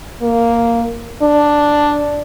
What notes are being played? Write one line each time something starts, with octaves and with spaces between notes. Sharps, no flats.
A#3
D4